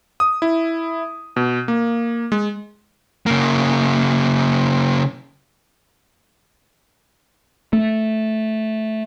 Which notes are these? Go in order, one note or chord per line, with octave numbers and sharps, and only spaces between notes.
D#6
E4
B2
A#3
G#3
C#3 A#3
A3